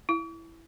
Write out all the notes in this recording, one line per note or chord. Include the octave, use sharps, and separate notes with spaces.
E4